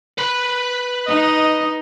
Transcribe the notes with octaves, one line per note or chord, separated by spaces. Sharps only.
B4 B5
D#4 D#5